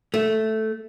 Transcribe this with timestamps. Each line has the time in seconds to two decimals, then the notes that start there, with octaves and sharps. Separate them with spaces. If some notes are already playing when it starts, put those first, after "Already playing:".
0.14 A3